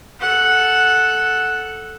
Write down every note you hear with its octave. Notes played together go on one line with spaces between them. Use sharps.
A4 F#5